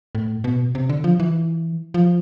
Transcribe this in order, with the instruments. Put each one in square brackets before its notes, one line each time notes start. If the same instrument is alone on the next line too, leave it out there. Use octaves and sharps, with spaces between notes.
[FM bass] A2
B2
C3
D3
F3
E3
F3